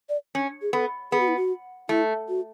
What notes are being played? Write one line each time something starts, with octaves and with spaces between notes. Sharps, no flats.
D5
C#4
G#4
B3 A4
B3 G#4
F#4
E4
F#4
A3 E4
F#4